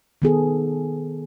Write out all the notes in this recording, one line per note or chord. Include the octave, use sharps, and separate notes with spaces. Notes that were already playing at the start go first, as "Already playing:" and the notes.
D#3 B3 G#4 A4